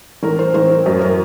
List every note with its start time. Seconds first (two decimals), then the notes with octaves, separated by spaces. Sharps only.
0.23 A1 A#4
0.39 C5
0.54 A1 C5
0.70 A#4
0.86 F#2 A#4
1.01 A#4